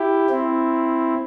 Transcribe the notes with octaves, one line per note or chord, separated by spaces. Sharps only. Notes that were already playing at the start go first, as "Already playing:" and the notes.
Already playing: E4 G4
C4 E4